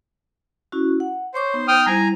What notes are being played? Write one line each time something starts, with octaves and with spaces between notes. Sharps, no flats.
C#4 E4 F#4
F#5
C5 C#5 C#6 D6
B3 D#4
G5 D#6 F6
G3 E4 C5 G#5 A#5